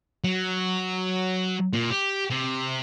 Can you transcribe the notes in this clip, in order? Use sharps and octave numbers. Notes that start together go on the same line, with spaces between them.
F#3
A#2
G4
C3